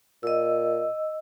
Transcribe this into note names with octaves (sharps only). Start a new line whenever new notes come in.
A#2 D#5 E6